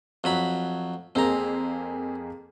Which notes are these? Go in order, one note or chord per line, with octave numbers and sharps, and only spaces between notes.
F2 F#3 B5
F2 A#3 C4 G#4 A#5